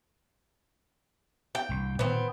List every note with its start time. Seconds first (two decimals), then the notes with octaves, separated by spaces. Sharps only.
1.55 G5
1.69 C2 G2
1.99 A#2 D3 D#3 B3 C4